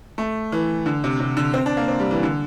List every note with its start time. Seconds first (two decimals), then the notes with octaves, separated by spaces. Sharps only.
0.18 A3
0.52 E3
0.86 D3
1.04 C3
1.20 C3
1.37 D3
1.54 C4
1.66 D4
1.77 A#3
1.88 C4
2.00 G3
2.11 E3
2.23 D3